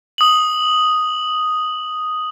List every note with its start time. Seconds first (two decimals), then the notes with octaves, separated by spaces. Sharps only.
0.18 D#6 F#7